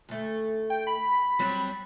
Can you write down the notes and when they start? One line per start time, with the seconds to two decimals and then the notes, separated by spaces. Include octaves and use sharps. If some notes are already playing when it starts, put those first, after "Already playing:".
0.09 D2 A3
0.70 G5
0.87 B5
1.39 F#3 G3 C4